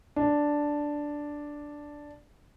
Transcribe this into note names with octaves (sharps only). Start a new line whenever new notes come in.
D4